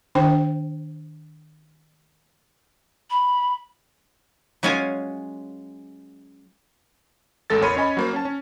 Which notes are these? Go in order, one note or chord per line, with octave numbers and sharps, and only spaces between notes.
D#3 D4 C5 G5
B5
F#3 G#3 C#4 F4 G#5
A1 G#3 A4 A6
E2 A#4 C#5 B5 C6 D#7
C#4 C#5 D#5 G#5 B5
F#3 A#3 C5
C#4 A5
C#4